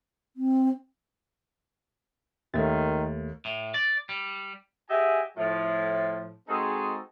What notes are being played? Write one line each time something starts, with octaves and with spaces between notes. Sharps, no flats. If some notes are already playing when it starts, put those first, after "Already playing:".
C4
D#2 D#3 A3 A6
A2
D5
G3
G4 G#4 D#5 E5 F#5 G#5
A2 F3
G#3 C4 D#4 F#4 G#4 A4